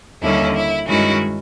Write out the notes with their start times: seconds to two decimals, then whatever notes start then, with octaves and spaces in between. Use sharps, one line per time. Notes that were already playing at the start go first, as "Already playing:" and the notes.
0.23 D#2 D3 G3 A#3 C#4 E4
0.56 E4
0.88 G2 D#3 G#3 C#4 E4 F#4